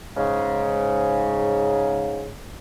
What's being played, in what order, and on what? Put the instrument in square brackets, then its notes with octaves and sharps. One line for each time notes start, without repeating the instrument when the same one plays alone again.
[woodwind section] G#2 C#3